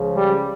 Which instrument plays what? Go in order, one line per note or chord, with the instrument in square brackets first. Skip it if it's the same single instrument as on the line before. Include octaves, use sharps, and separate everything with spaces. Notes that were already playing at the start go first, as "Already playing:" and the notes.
Already playing: [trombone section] C#2 C#3 F3
G3